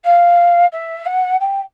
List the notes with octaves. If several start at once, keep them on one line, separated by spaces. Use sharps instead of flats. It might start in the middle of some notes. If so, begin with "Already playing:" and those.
F5
E5
F#5
G5